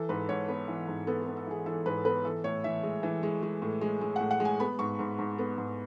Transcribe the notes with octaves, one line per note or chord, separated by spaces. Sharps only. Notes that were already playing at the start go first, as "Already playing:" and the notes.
Already playing: E3 A4
G#2 B4
G#2 C#5
B3 B4
E3
G#2
B3 A4
A4
B3
A4
E3 G#4
E3 A4
G#2 B4
B3 B4
E3 A4
A2 C#5
E3 E5
G#3
E3
G#3
G#3
A2
G#3
G#3
A2 F#5
F#5
G#3
G#5
B3 B5
G#2 C#6
G#2
G#2
B3
G#2